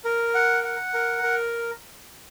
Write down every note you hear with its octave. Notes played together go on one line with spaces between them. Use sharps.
A#4
F#5
F#5
A#4
A#4